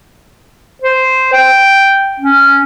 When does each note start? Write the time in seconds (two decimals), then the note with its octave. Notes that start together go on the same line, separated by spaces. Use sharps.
0.82 C5
1.33 G5
2.20 C#4